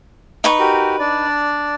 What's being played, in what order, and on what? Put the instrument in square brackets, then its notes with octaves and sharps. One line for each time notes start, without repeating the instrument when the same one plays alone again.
[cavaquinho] D#4 B4 C#6
[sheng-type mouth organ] F#4 G4 A#4
D4 D5